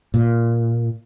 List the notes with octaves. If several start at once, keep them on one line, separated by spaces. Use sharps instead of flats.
A#2